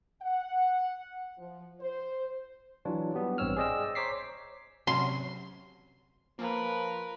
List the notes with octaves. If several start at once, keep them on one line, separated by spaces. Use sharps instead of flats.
F#5
F3
C5
E3 F#3 D4 F4 C#5
G3 B3 G4
A1 G2 C4 C#5 E6 F6
G#4 C5 D5 D#5 G5 E6
C5 C#5 A#5 D6 B6 C7
C3 F#3 C#4 C6
F3 A#3 A#4 B4